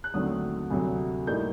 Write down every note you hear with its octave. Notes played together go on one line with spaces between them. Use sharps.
F#6
D#2 D3 F#3 A3 C4 D#6
D2 C3 F#3
A2 G3 A#3 D#4 G6